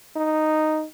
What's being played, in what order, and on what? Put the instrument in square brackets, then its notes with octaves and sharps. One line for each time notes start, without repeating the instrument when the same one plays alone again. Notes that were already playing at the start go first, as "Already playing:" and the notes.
[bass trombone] D#4